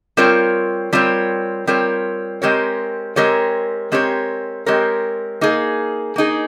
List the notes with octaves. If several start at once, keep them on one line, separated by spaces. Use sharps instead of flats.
G3 C4 F4 A#4 C#5
G3 C4 F4 A#4 C#5
G3 C4 F4 A#4 C#5
G#3 C4 G4 A#4 C#5
G#3 C4 G4 A#4 C#5
G#3 C4 G4 A#4 C#5
G#3 C4 G4 A#4 C#5
A#3 D#4 G#4
A#3 D#4 G#4